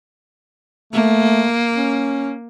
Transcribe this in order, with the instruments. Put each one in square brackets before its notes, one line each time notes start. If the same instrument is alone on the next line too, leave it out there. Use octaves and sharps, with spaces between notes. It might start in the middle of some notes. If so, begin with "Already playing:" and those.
[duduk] A3 [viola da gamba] A#3
[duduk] C#4